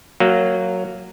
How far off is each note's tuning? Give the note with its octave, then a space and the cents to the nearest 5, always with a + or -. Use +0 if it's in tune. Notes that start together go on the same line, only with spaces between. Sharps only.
F#3 +0 A#3 -15